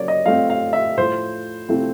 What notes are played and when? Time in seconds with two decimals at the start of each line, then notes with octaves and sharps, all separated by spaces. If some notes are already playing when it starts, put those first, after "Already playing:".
Already playing: C#3 F#3 A#3 C#5 D5
0.08 D#5
0.26 F3 A3 C4 F5
0.50 F5
0.73 E5
0.97 A2 F3 A3 C5
1.69 C3 F3 A3 C4 E4